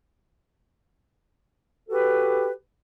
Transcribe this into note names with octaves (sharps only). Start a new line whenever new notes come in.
F#4 G4 A4 B4